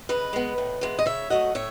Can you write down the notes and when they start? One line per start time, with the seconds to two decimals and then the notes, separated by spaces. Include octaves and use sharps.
0.09 C#3 B4 D#5
0.33 G#3 B3
0.58 A2
0.81 E3 G#3 B3
0.99 D#5
1.06 C#3 C#5 E5
1.30 F#3 A3 D#5 F#5
1.55 A2 C#5 E5